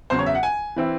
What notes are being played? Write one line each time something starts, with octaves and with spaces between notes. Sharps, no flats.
E2 C#3 F#3 C5
C#5
E5
F#5
G#5
E3 C4 E4